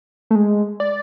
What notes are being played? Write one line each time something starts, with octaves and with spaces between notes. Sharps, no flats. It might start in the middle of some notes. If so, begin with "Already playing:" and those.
A3
G#3
D5